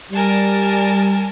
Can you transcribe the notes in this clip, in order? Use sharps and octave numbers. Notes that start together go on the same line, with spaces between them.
G3 A#4 G#5 A5